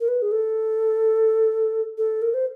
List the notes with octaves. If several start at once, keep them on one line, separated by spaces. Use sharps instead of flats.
A#4
B4
G#4
A4
A4
A#4
C5